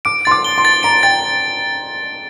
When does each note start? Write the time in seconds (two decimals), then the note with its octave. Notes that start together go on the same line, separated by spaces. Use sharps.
0.05 D6 D7
0.25 C6 A6
0.31 D6
0.45 G7
0.58 C6
0.65 A6
0.83 A#5 D7
1.03 G5 A6